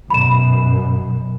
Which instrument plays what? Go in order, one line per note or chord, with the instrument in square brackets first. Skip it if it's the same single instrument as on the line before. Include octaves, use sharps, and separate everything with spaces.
[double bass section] F#2 B2 [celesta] B5 E7